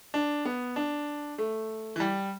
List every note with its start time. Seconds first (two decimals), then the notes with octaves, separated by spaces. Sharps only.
0.14 D4
0.45 B3
0.76 D4
1.38 A3
1.96 E3
2.00 G3